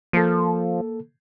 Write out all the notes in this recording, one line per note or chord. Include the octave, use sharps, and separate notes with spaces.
F3 A#3 A4